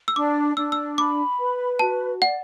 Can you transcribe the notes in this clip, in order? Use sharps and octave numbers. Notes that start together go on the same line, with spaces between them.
E6
D4 D6
D4 E6
E6
B5 D6
B4
F#4 A5
D5 F#5